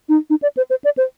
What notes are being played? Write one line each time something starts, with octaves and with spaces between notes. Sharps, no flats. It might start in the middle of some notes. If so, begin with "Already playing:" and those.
D#4
D#4
D5
C5
C5
D5
C5